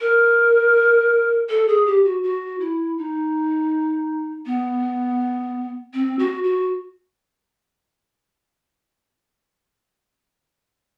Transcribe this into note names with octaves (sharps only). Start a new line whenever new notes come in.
A#4
A4
G#4
G4
F#4
F#4
E4
D#4
B3
C4
F#4
F#4